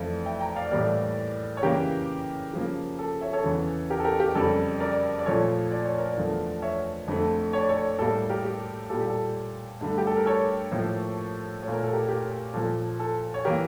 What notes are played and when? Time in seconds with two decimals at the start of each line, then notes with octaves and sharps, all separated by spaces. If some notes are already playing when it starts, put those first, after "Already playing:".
Already playing: F2 E3 A3 D5 F5
0.26 E5 G5
0.40 G5 A#5
0.56 D5 F5
0.71 A2 E3 G3 A#3 A#4 D5
1.57 C#5
1.63 C#3 E3 A#3 G4 A#4
2.54 C#3 F3 A#3
2.99 A4
3.21 C#5 E5
3.33 A4 C#5
3.44 E2 C#3 E3
3.90 G4 A#4
4.00 A4
4.04 G4 A#4
4.20 G4 A#4
4.35 F2 C#3 G3 A4
4.80 A#4 D5
5.19 D5
5.26 A#2 F3 A3 A4 C#5
5.72 D5
5.86 C#5
5.98 A#4 D5
6.17 E2 D3 F3 A3
6.62 C#5 E5
7.08 F2 D3 A3
7.53 C#5
7.61 D5
7.69 A4 C#5
7.99 A2 G3 A#3 A4
8.29 G4 A#4
8.44 G4
8.89 A#2 G3 A#3 A4
9.00 G4
9.10 A4
9.81 G2 D3 A3
9.98 G4
10.07 A4
10.17 A#4
10.26 A4 C#5
10.71 A2 F3 A#3
11.62 A3 C#5
11.68 A#2
11.73 A#4
11.84 A4
11.93 G4 A#4
12.09 G4 A#4
12.54 A#2 F3 A#3 A4
12.99 A4
13.34 C#5
13.45 E3 A#3 G4 A#4